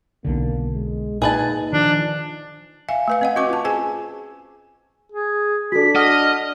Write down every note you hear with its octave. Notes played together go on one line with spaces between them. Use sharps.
B1 D3 A#3
G#3
A#2 D#4 G#4 B4 A5
D#3 F3 D4
E5 F5 G#5
A3 B4 F5
C4 D#5 F#5
C#4 F#4 B4 C#6 D6
F4 A5
G#4 C5 G#5
G#4
D4 F#4 A4 B6
D#5 F#5 F6